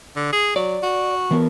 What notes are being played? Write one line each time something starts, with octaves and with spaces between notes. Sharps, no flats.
D3
G#4
F#3 D5
F#4
E3 B3 A#4